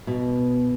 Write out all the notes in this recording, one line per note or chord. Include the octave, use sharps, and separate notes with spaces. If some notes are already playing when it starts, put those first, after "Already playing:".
B2